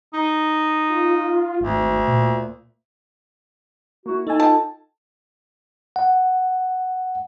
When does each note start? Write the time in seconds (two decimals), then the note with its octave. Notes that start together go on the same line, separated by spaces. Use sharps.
0.14 D#4
0.89 F4
1.60 G#1 D2
2.07 A#2
4.06 A#3 E4 F#4
4.27 D#4 A4 G#5
4.40 F4 D#5 G5 A5
5.96 F#5